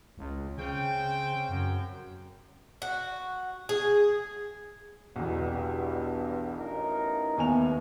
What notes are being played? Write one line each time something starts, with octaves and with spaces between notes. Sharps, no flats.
C#2
C#3 C4 G5
F#2
F#4
G#4
B1 E2 G2
A1 D#4 A#4
D#2 A2 B3 G#5 F7